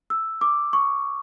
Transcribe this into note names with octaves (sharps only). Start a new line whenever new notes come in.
E6
D6
C#6